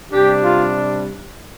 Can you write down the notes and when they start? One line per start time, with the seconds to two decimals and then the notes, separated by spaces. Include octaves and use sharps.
0.12 C3 G3 D4 G4
0.43 F4